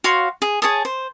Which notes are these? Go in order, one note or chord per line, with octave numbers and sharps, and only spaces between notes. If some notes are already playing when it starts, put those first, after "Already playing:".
F#4 C#5 F5 C6
G#4
G#4 C#5 A5 D#6
C5